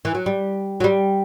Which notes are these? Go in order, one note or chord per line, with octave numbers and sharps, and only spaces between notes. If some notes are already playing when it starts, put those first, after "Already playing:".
E3
F#3
G3
F#3
G3